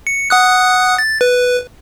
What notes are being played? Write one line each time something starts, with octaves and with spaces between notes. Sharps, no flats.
C#7
F#5 D#6 F#6
A6
B4